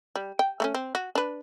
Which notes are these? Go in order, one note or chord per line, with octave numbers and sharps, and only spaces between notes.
G3
G5
A3 A#3 C#4
C4
F#4
D4 B4